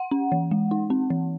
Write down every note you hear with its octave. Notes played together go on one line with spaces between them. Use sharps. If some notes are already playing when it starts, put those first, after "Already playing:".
Already playing: F#5
C#4
E3
G#3
D#4
C4
E3